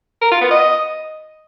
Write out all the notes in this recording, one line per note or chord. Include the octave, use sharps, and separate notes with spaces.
A#4
F4
B3
D#5